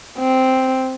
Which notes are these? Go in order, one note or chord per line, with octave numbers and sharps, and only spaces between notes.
C4